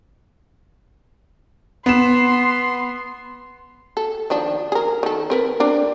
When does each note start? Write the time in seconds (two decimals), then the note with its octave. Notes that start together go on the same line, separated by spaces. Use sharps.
1.86 B3 C6 E7
3.97 A4
4.30 D#3 F3 D4
4.72 G#4 A#4
5.03 D#3 A4
5.30 C4 A#4 B4
5.60 C4 D4 A#4